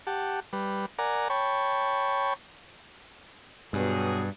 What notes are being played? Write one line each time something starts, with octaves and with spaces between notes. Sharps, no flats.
G4 F#5 A5
G3 B4
A#4 D5 F#5 G#5 A#5
C#5 G5 A5 B5 C#6
G2 B2 F#3 G#4